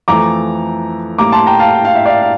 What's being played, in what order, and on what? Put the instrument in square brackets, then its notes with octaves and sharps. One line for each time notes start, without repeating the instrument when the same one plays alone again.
[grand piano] F2 E3 A3 A#5 D6
A2 G3 A#3 A#5 D6
A5 C6
G5 A#5
F5 A5
G5
F5
E5
D5 F5
F5